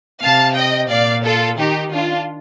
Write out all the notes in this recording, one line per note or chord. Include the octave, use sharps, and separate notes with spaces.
C3 F5 A5
D#5 G5
A#2 D5 F5
F4 A4
D#3 D#4 G4
D4 F4